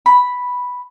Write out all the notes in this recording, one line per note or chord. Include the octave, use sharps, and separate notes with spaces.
B5